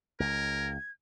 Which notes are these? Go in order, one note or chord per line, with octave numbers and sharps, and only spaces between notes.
C#2 A#4 G#6